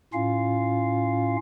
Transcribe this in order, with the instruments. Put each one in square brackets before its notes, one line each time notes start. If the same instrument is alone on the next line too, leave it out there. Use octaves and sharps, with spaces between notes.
[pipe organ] A2 C#4 F4 F5